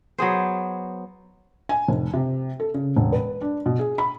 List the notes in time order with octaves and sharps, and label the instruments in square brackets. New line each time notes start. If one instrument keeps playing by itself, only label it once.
[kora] F#3 B3 G#4 C5
[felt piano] G#5
F1
C3
A4
C#3
E1
B4
D4
B2
G#4
B5